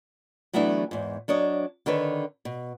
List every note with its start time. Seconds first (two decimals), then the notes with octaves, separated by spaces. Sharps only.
0.53 E3 F#3 A3 B3 D4 E4
0.91 E2 G#2
1.28 F#3 D4 C#5 D#5
1.86 D3 D#3 A4 B4 C#5
2.45 B2